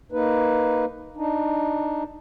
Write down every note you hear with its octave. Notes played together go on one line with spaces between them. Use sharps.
A#3 D#4 B4
D4 D#4